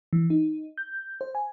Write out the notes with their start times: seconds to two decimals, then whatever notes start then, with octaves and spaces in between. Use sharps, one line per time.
0.13 E3
0.30 D#4
0.78 G6
1.21 C5
1.35 G#5